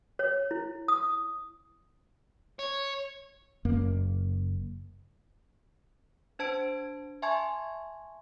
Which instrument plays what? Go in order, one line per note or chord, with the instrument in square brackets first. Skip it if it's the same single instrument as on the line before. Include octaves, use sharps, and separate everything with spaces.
[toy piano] C#5
E4
D#6
[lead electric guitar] C#5
[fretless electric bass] F#1 F#2 A#3
[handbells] D4 C5 A5 G#6 D7
E5 G#5 A5 C6 C#6 G#6